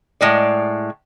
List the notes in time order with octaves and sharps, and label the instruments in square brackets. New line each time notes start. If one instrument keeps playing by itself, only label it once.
[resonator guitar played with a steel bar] A2 G#3 D5